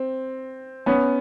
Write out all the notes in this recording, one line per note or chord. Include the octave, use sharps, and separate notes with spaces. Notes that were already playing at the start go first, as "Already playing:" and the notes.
Already playing: C4
B3 C#4